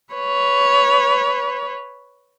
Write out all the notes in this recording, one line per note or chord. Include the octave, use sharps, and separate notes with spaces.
B4 C#5